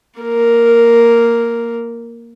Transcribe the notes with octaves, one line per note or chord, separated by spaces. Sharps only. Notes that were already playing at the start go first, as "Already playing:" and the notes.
A#3 A#4